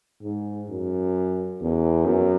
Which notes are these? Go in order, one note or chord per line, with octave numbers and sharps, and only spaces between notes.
G#2
F#2
E2
F#2